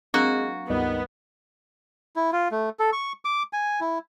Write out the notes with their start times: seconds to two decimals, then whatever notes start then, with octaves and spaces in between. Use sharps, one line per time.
0.14 F#3 G#3 A#3 C4 D4 F#4
0.70 C#2 G2 D#3 G3 B3
2.16 E4
2.32 F4
2.51 A3
2.79 A4
2.93 C#6
3.25 D6
3.53 G#5
3.81 E4